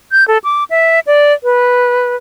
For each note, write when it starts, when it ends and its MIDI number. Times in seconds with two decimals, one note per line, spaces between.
0.12 0.27 91
0.28 0.38 69
0.44 0.64 86
0.70 1.00 76
1.07 1.33 74
1.44 2.16 71